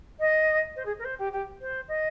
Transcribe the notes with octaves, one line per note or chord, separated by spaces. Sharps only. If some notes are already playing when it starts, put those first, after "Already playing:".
D#5
C5
G#4
A#4
C5
G4
G4
C5
D#5